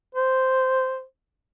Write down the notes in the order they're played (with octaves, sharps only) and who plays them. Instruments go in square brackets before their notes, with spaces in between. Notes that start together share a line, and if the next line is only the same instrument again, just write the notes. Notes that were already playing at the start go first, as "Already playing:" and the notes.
[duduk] C5